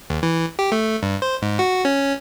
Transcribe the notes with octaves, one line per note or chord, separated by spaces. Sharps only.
D#2
E3
G4
A3
G2
C5
G#2
F#4
C#4